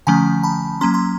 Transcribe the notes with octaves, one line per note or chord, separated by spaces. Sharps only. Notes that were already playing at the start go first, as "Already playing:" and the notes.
D3 F3 A3 C#4 G#5 A#5
A5 B5
F#3 A#3 C#4 A#5 C6
A#5 C6